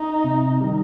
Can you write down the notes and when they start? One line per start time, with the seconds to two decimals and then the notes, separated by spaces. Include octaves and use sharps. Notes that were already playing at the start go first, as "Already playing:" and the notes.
Already playing: D#4
0.24 C3
0.61 D#3 G3